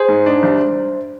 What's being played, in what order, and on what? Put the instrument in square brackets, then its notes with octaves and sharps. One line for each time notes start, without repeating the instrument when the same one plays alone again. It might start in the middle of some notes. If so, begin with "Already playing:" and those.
Already playing: [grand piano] G#4 [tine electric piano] C5
[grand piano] G#2
D4
C2